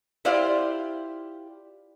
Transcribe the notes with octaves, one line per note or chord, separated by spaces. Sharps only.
E4 F4 G4 C5 D5 F5